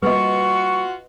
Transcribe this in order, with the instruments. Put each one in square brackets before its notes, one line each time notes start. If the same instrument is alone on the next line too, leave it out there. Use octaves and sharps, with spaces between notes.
[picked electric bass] G3 A3 A#3 [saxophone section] F4 F#4 [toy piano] B4 D#5 [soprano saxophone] C#6